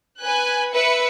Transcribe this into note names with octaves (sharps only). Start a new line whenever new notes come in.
B4 G#5 F#6
B4 E5 C#7